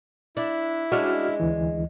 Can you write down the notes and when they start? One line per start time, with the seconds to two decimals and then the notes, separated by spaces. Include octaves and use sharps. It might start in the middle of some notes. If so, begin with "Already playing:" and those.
0.37 D4 E4
0.92 G#3 C#4 D4 F#4 F6
1.40 D2 E3